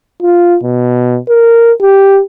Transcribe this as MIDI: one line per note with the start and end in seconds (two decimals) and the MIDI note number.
0.22 0.58 65
0.63 1.18 47
1.28 1.72 70
1.81 2.21 67